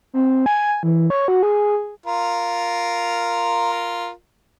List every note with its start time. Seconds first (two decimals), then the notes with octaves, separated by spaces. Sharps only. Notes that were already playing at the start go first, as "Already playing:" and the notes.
0.14 C4
0.46 G#5
0.83 E3
1.10 C#5
1.28 F#4
1.43 G#4
2.06 F4 A#4